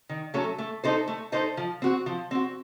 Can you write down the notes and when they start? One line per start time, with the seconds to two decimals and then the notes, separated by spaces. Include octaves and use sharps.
0.09 D#3
0.34 F#3 A3 C#4 A4
0.58 A3
0.84 D#4 A4 C5
1.08 A3
1.32 D#4 A4 C5
1.57 F3
1.82 C4 F#4
2.06 F3
2.31 C4 F#4